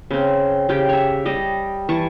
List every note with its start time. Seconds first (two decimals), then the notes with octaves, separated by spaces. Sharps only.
0.11 C#3 C4
0.69 C#3 G4 G5
0.89 C#5 E5
1.26 G3 D#5
1.89 E3 A5 C#6